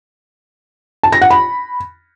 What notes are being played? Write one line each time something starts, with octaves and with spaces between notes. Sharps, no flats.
A5
A#6
F#5
B5